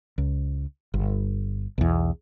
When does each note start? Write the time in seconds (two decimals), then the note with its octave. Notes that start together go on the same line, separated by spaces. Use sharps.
0.18 C#2
0.94 G1
1.78 B1 E2